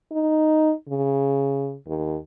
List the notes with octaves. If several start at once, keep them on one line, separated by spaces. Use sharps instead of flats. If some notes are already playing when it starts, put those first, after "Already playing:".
D#4
C#3
D#2